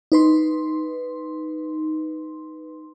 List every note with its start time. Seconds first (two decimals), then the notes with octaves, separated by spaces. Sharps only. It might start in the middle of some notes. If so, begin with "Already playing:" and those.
0.12 D#4 B4 C6